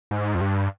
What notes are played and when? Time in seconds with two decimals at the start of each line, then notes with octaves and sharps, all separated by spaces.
0.11 G#2
0.35 F2
0.41 G2